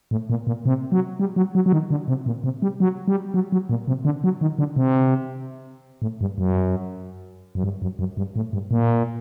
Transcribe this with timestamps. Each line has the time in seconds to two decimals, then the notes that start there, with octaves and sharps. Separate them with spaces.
0.11 A2
0.30 A#2
0.47 A#2
0.66 C3
0.92 F#3
1.20 G3
1.36 F#3
1.55 F#3
1.66 F#3
1.72 D#3
1.90 D3
2.08 C3
2.26 A#2
2.44 C3
2.62 G3
2.80 F#3
3.08 G3
3.34 F#3
3.52 F#3
3.69 A#2
3.88 C3
4.05 D3
4.24 F#3
4.41 D#3
4.59 D3
4.76 C3
6.02 A2
6.21 G2
6.38 F#2
7.55 F#2
7.64 G2
7.82 F#2
7.99 F#2
8.17 G2
8.36 A2
8.53 G2
8.71 A#2